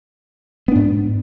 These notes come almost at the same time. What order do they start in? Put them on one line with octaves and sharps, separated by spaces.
B3 D4 G#2